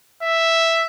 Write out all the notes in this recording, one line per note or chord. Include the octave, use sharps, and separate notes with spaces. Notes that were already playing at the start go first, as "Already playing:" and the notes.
E5